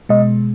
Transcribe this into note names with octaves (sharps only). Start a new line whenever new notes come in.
B2 G#3 D#5